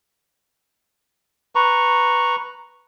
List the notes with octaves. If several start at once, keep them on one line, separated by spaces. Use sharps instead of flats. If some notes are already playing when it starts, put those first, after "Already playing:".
B4 A#5 C#6